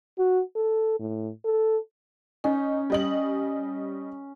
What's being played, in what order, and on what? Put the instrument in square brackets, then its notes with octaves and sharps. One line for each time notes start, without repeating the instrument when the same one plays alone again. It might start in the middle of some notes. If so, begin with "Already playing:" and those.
[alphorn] F#4
A4
A2
A4
[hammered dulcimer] C#4 [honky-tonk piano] D#4
[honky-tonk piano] G3 D#5 F#7